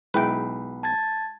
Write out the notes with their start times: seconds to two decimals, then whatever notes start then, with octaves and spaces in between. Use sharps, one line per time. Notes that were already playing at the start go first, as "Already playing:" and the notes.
0.14 B1 G#3 E4 B4 G5
0.83 A5 G#6 A6